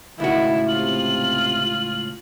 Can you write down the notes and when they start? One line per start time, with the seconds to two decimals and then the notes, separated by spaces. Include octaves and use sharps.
0.20 C#2 A2 D#3 E4 F#4
0.68 C3 F4 F#7